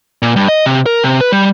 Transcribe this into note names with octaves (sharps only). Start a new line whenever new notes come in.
A#2
G2
D#5
C3
A#4
C3
B4
G3